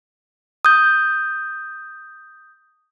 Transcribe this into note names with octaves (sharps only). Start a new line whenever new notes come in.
D#6 G6